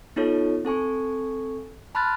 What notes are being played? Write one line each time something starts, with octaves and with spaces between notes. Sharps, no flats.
B3 D#4 F4 A4 C#5
C4 A4 G#5 C#6
A5 B5 C6 F6 F#6 A6